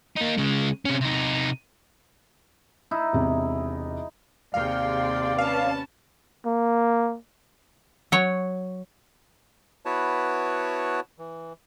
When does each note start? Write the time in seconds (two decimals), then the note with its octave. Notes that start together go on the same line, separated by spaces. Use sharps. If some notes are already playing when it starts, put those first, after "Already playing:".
0.17 A#3 D#4
0.38 C#3 G#3
0.85 C3 C#4
1.01 C3 D#4
2.91 D#4 E4
3.13 E1 C3
4.54 D#2 C3 G#4 D5 F5 G5 C6
5.38 C#4 B4 F5 A5
6.46 A#3
8.12 F#3 C#5
9.86 B3 E4 F#4 B4 C#5 A5
11.19 E3